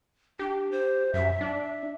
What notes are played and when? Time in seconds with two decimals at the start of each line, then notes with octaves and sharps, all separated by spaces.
0.39 D4 G4
0.72 C5
1.14 F#2 E5
1.41 D4